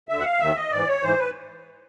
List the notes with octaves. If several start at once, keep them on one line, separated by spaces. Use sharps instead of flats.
D2 D3 E5
F#5
F5
D#2 D#3 E5
D#5
G#2 E3 D5
C#5
G#2 E3 C5
B4